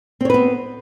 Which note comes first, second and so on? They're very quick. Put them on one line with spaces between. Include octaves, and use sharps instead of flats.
C4 C#5 B4 B3